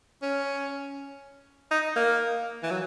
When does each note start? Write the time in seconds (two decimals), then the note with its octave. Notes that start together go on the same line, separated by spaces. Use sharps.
0.22 C#4
1.71 D#4
1.96 A#3
2.63 E3
2.71 F#3